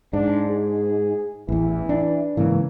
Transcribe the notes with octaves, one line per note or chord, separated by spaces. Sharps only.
G#2 D4
G#4
A1 E2 E3
D4
G#2 C#3 E3 A#3